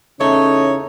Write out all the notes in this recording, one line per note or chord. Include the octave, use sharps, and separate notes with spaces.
E2 C#3 A3 C#4 D#4 C#5